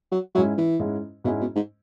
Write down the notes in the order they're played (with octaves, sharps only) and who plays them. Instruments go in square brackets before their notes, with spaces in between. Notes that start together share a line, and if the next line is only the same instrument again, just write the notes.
[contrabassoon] F#3
[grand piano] G#2 G#3 C#4 E4 [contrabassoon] F#3
[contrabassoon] E3
[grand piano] G#2 G#3 C#4 E4
[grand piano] G#2 G#3 C#4 E4 [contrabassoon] B2
[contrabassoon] B2
G#2